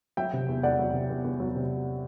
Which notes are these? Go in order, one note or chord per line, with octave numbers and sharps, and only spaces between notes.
F#3 E5 G5
C3
E2
E2 D5 F#5
F#3
C3
E2
E2
F#3
C3